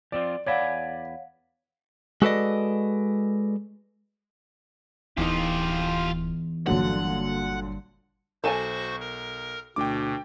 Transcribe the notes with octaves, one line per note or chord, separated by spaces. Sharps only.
F3 C4 F4 D5
E2 C#5 D5 F5 F#5 G#5 B5
G#3 F#4 A4 B4 D5 D#5
D1 E2 E3 D#4 F4 G4
G1 A#2 D3 F#3 G3 F#5
B1 F#4 A4 C5 G#5 A5 C#6 E7
A#4
D2 B2 G5 D6